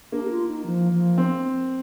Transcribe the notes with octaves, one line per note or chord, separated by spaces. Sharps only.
A#3 D4
G4
F4
D#4
F3
F3
C4